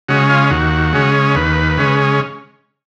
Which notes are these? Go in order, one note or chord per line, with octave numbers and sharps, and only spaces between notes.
C#3 G#3 C#4 F#4
F4
D#2 F#4
C#3 G#3 C#4
D#2 B4
C#3 G#3 C#4